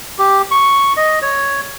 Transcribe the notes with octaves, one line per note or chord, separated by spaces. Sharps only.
G4
C#6
D#5
C#5